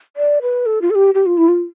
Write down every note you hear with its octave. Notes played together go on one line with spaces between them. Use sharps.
D5
B4
A4
F4
A4
G4
G4
F4
E4
F4